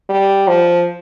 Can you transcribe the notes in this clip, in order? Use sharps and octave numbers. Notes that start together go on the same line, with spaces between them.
G3
F3